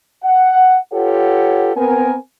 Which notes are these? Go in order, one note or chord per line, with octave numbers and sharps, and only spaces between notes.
F#5
F4 G4 A4 B4 C#5 F#5
B3 C4 A#4 G#5